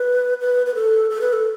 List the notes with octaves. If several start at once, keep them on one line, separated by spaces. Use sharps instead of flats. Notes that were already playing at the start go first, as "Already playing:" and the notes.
Already playing: B4
B4
B4
A4
A4
B4
A4